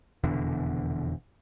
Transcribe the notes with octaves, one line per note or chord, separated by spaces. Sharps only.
F1 E2 B2 D3